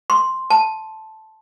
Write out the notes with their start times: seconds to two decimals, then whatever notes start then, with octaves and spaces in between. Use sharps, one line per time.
0.10 C6
0.50 A5